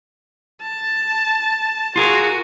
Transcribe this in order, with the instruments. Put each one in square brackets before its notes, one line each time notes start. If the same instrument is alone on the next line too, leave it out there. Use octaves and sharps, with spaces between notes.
[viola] A5
[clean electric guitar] F4 G#4 A#4 [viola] F#4